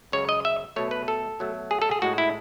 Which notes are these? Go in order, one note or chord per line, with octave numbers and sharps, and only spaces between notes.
F#2 C#3 G#3 C#5
D#5
E5
B2 F#3 A3 C#5
B4
A4
B2 F#3 A3
G#4
A4
G#4
A2 G#3 F#4
E4